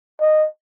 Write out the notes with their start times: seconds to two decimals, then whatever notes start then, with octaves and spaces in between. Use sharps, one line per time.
0.21 D#5